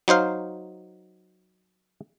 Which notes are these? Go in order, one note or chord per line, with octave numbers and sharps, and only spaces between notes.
F#3 D#4 C5 F5